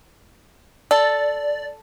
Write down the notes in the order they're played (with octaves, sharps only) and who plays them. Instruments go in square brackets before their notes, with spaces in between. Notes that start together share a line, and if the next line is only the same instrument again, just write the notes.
[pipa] A4 [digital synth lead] D5